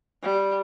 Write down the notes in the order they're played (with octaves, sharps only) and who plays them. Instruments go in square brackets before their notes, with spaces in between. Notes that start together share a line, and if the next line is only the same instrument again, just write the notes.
[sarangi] G3